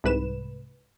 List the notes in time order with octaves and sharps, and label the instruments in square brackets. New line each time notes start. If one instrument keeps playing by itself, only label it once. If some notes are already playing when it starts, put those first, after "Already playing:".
[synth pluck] C2 G#2 B4 E7